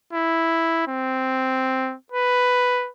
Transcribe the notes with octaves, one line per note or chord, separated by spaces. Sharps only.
E4
C4
B4